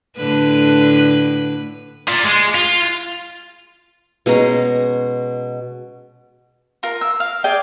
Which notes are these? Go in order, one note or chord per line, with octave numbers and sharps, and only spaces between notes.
A2 D3 B4
F4 D5
G#3
F4
B2 G#3 C#4 A#5
F4 A#4
E6
F5
G#4 D5 G5